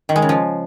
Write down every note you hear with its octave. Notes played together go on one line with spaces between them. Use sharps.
D#3
G#3
C#3
F3